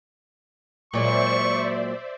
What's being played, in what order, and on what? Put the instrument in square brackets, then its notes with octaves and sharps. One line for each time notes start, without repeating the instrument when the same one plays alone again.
[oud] A#2 F#3 G#3 [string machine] C5 D5 E5 [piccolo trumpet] C#6